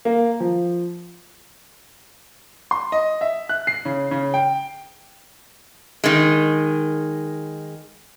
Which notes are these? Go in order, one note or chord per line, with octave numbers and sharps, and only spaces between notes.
A#3
F3
C6
D#5
E5
F#6
C7
C#3
C#3
G5
D#3 G#3